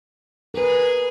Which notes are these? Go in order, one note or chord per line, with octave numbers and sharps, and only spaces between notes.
G#4 A#4 B4